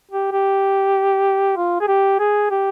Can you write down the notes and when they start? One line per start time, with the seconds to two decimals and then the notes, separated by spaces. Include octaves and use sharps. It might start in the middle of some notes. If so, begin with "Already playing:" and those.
0.11 G4
0.32 G4
1.56 F4
1.81 G#4
1.88 G4
2.19 G#4
2.51 G4